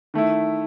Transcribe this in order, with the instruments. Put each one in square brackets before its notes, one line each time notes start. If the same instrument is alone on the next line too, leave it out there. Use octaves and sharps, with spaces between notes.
[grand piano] D#3 A3 E4